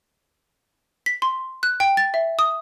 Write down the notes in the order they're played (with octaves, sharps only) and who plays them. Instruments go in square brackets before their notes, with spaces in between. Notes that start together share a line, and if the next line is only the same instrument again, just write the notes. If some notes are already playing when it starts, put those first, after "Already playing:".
[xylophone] B6
C6
F#6
G5
A6
E5
D#6